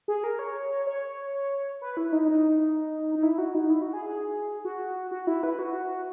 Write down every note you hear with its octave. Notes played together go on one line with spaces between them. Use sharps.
G#4
A#4
C#5
C#5
B4
E4
D#4
D#4
D#4
E4
F#4
D#4
E4
F#4
G#4
G#4
F#4
F#4
E4
B4
F#4